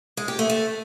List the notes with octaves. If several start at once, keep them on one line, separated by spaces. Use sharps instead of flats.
G#3
G4
A3
A3